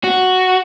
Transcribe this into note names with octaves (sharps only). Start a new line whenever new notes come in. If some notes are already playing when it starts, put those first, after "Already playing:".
F#4